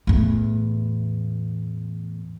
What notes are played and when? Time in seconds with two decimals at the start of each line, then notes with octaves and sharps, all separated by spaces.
0.07 E2 A2